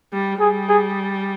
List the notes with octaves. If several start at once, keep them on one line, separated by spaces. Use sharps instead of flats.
G3
G3 G#4
G#4